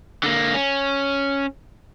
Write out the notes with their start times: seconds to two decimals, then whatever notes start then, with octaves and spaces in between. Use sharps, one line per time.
0.23 D3 A#3
0.54 C#4